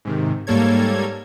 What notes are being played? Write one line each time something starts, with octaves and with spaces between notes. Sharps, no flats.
G#2 C3 D#3
G#2 G3 A#3 A4 C#5 G#6